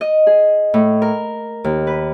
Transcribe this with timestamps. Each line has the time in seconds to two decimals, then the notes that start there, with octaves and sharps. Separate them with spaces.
0.01 D#5
0.27 G#4
0.74 A2
1.02 A#4
1.64 D#2
1.87 B4